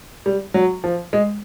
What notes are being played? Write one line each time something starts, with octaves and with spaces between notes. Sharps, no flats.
G3
F#3
F3
G#3